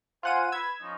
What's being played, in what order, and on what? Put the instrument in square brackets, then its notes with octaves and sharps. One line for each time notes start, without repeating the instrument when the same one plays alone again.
[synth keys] F4 F#5 D#7 [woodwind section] C5 G#5
[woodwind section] B4 B5 [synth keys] E6 G#6
[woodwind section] F3 C#4 D#4